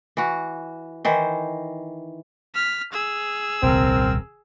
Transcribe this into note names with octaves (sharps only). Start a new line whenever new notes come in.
E3 F#4
D#3 E3 C5
F6 B6
G#4 E6
D#1 C2 C4 A#4